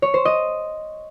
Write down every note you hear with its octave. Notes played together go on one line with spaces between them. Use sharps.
C#5
C5
D#5